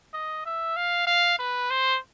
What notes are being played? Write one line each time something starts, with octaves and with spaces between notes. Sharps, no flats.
D#5
E5
F5
F5
B4
C5